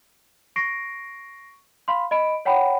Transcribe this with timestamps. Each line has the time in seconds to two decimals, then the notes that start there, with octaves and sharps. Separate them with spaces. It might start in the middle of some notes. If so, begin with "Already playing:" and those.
0.56 C#6 A#6 C7 D7
1.88 F5 B5 C6
2.11 D#5 B5 D7
2.45 C#5 F#5 G5 A#5 B5